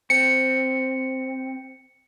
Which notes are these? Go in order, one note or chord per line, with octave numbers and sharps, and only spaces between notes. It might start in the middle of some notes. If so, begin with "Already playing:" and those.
C4 C#7